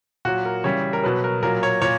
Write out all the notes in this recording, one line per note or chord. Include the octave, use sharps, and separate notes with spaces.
A#2 F#3 F#4
A#4
C#3 E3 G3 C#5
A#4
B2 F#3 B4
A#4
A#2 F#3 A#4
C#5
A#2 C#5